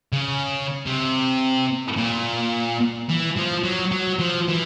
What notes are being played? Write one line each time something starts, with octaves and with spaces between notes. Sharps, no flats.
C#3
C3
A#2
E3
F3
F#3
F#3
F3
E3